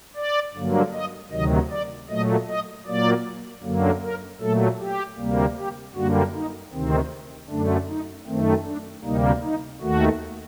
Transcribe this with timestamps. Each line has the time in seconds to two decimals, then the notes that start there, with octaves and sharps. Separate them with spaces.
0.16 D5
0.55 G2 D3 F#3 A#3
0.93 D#5
1.32 D2 C3 D#3 F#3 D#5
1.71 D5
2.09 A#2 F#3 A3 D#5
2.48 D#5
2.87 A#2 F#3 A#3 D5
3.63 F#2 D3 F#3 A#3
4.03 A#4
4.41 A#2 F#3 A3 A4
4.80 G4
5.18 D2 C3 G3 A#3
5.57 G4
5.95 F#2 D3 G3 A#3 F#4
6.34 D#4
6.73 D2 C3 D#3 C4
7.50 F#2 D3 A3 D4
7.89 D#4
8.27 F#2 D#3 A3 C4
8.66 D4
9.04 D2 C3 G3 A#3 D#4
9.43 D#4
9.82 D#2 D#3 A3 F#4